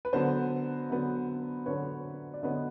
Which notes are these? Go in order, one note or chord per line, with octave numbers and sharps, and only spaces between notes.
B4
D3 F#3 B3 C5
D3 F#3 B3
D3 F#3 B3 B4 C#5
D5
D3 F#3 B3 C#5 D#5